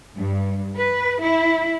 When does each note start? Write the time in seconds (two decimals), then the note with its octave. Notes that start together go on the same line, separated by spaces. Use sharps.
0.15 G2
0.76 B4
1.21 E4